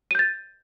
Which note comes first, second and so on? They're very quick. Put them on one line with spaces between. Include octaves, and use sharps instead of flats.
D#7 G6 A6